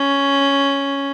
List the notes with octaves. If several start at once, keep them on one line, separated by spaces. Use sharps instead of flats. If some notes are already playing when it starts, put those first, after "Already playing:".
Already playing: C#4